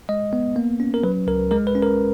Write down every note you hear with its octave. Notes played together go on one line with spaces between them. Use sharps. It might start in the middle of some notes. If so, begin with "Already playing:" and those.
G#3 D#5
B3
A#3
C#4
A#4
F#3 B4
C#2 A#4
G#3 A#4
B4
C#4
A#4